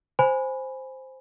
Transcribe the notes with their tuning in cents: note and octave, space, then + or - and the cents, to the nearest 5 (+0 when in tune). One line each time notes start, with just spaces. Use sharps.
C5 +0 G#5 +0 B5 +0